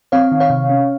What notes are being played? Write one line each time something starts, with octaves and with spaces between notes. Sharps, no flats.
C4 C#5 F5
D#3
C#5 F5
C3
C#4